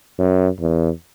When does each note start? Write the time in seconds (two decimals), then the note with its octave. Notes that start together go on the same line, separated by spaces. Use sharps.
0.19 F#2
0.60 E2